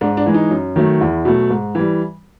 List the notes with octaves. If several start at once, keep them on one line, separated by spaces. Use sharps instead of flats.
G#2 D4
D4
E3 G#3
D#4
F#2
D#3 F#3 A3
E2 E4
B2 F#3 A3
G#2
E3 G3